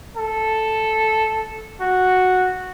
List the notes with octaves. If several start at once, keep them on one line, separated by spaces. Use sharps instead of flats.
A4
F#4